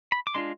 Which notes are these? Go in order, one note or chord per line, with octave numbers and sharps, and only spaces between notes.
B5
D6
G#3 D4 F4 C6